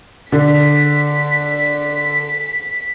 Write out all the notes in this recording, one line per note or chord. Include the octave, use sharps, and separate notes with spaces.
D3 B6